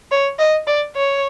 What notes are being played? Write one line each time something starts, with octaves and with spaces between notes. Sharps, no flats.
C#5
D#5
D5
C#5